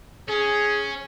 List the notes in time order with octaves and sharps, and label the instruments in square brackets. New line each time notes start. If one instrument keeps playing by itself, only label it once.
[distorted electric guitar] C#4 [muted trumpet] G#4